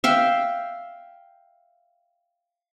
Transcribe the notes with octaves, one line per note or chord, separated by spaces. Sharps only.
E5 F5 G5